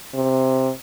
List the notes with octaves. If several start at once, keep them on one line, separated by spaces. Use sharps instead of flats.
C3